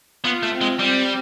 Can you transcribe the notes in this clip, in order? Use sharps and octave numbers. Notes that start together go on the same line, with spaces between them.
B3 F4
A3
C4
G#3
G3 C4